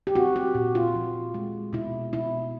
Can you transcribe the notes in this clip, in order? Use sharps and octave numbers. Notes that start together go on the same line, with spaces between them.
G4
C4 F#4
G4
A#2
F4
F3
G#3
B2 E4
B2 E4